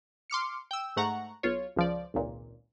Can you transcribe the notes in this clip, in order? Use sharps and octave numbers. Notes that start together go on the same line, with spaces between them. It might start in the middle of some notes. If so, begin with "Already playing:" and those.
C6 D6 F6 C#7
G5 E6
G#2 A3 F#5 A#5 C#6
B1 F4 C#5
C#2 F3 D5
G#1 C#2 A#2